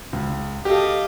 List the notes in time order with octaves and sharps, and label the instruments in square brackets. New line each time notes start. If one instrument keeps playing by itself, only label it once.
[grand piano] C#2
[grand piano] G4 A4 [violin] D#5 F5